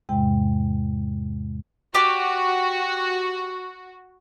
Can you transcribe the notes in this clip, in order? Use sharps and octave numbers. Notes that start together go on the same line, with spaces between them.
E2 G#2 C3 G#3 G5
F#4 G4 D5